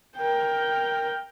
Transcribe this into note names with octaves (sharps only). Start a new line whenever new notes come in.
A#4 G5